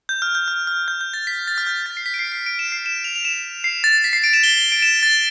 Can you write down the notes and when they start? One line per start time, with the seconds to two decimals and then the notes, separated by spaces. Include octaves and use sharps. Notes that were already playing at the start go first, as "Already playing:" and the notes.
0.09 G6
0.22 F6
0.35 G6
0.48 F6
0.67 F6
0.88 G6
1.01 G6
1.14 A6
1.27 B6
1.47 A6
1.58 F6
1.67 G6
1.86 A6
1.97 C7
2.06 B6
2.14 D7
2.19 C7
2.32 C7
2.46 D7
2.59 E7
2.72 C7
2.86 E7
3.04 F7
3.16 F7
3.25 E7
3.64 C7
3.84 A6
4.04 B6
4.13 C7
4.24 D7
4.33 E7
4.43 G7
4.57 G7
4.72 D7
4.82 E7
5.03 A6